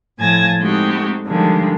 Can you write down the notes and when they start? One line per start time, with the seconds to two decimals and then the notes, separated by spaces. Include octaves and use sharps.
0.18 A2 F3 G#5 A5 G#6 A#6
0.59 G#3 A3 C4 D#4 F#4 G4
1.27 D3 D#3 F3 G3 G#3 D4